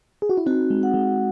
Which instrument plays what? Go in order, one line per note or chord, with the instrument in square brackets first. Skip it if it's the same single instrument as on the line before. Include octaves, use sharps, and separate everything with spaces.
[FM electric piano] G#4
F#4
E4
[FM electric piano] C4 D#4 [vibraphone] F#4
[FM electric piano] G#3
[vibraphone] F#5
[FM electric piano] G#3